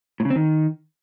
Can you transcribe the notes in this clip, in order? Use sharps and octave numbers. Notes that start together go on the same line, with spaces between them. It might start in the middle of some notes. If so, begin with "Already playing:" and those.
A2
C#3
C4
D#3